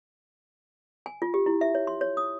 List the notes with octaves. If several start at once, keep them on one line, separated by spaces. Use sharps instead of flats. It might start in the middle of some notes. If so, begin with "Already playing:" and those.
G#5
F4
G4
E4
E5
C#5
C6
C#5
D#6